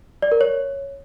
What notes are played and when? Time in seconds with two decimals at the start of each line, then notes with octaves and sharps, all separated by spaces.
0.22 D5
0.32 A#4
0.41 C#5